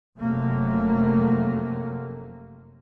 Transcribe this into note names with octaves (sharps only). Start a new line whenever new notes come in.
F1 F#2 C3 F#3 A3 A#3